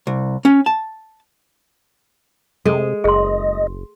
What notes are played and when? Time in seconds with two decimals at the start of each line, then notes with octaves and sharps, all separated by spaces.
0.07 C2
0.45 C#4
0.66 A5
2.65 C3 G#3 A4
3.04 F#1 G#4 D#5 C6